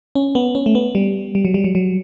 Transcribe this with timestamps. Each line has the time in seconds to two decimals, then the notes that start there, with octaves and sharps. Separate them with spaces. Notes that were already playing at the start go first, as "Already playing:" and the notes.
0.15 C#4
0.35 B3
0.55 C#4
0.66 A3
0.75 B3
0.95 G3
1.35 G3
1.45 F#3
1.54 G3
1.64 F#3
1.75 F#3